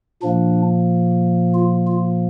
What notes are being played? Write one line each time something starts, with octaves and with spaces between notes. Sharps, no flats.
A#2 F3 A#3 D4
F4
F4